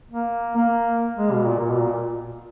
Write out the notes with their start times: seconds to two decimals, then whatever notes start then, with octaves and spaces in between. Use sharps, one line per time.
0.11 A#3
0.57 A#3
1.17 G#3
1.32 B2
1.47 A#2
1.59 A#2
1.70 B2
1.82 A#2